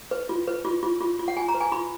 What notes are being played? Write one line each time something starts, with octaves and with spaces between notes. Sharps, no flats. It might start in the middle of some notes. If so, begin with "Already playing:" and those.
B4
F4
B4
F4
F4
F4
F4
F#5
F4 G#5
A#5
B4
G#5
F4 B5